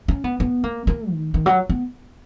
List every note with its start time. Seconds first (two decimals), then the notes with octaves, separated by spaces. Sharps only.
0.08 C#4
0.24 B3
0.40 B3
0.64 A#3
0.87 A#3
1.11 D#3
1.34 D#3
1.46 F#3
1.69 B3